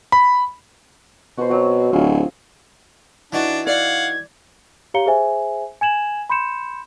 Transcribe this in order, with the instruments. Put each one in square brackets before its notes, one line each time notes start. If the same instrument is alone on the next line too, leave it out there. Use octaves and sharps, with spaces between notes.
[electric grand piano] B5
[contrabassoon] B2 [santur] F#4 C5
[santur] F#3 C4 F#4
[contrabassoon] D1 [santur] F4 G#4
[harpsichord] E3 D#4 F#4 [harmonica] D4
[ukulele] D5 [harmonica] F5 F#5 [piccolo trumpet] G#6
[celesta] G4 C#5 F5 A#5 C#7 G7
G#4 C5 E5 G#5
G#5 G#6 E7 F#7
B5 C6 G6 C#7 E7